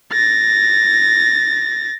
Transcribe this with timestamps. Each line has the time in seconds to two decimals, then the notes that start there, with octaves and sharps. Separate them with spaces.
0.13 A6 A#6